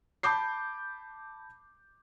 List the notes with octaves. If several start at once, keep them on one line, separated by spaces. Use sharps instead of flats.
A5 B5 D6 G6 C7